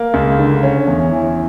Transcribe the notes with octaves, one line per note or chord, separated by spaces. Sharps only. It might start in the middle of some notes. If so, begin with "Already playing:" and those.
Already playing: A#3
C#2
D3
C#4
E2
E3